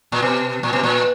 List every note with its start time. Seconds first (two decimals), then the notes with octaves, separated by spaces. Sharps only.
0.12 A#2
0.22 B2
0.63 A#2
0.73 B2
0.83 A#2